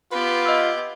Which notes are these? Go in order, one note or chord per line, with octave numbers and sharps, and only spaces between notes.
B3 F4 G4 B4
D#5 E6